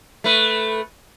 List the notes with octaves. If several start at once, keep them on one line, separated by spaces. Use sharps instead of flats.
A3 B4